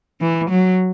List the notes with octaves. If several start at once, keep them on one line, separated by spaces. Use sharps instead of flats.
E3
F#3